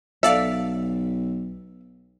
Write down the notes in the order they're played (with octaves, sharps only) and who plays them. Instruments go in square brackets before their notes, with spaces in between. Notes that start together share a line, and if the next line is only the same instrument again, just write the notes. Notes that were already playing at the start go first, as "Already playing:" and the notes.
[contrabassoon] B1 [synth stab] A4 D5 F5 [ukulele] E5